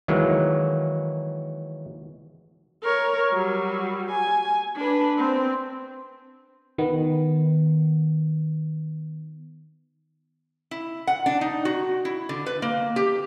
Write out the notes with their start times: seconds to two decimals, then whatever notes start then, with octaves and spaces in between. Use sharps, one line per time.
0.08 D#3 E3 F#3 G#3 A#3
2.83 A#4 C#5
3.31 F#3 G3
4.11 G#5
4.76 D4 B4
5.18 C4
6.78 D#3 B3
10.71 E4
11.07 F#5
11.26 D4
11.41 D#4
11.65 F#4
12.05 E4
12.29 D3
12.46 B4
12.62 A#3
12.96 G4